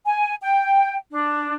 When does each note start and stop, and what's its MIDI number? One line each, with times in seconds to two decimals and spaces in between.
0.05 0.36 80
0.41 0.94 79
1.10 1.54 62